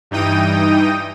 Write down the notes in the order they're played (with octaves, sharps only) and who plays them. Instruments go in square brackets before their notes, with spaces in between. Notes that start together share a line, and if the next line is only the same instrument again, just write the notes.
[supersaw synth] G2 E3 D#4 G5 D#6 D#7